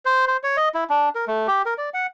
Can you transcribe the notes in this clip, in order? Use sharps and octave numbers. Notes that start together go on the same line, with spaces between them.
C5
C5
C#5
D#5
E4
D4
A#4
A3
G4
A#4
D5
F#5